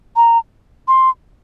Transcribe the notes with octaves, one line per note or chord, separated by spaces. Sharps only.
A#5
C6